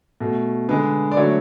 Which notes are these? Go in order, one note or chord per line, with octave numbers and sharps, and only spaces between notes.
B2 A3
D3 G#3 B4
D5
D3 F#3 A3 C#5